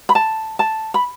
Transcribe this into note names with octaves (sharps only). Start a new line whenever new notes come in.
B5
A5
A5
B5